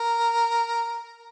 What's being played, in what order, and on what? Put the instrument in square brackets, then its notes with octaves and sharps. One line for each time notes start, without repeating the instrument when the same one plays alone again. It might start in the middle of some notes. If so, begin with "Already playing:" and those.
Already playing: [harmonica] A#4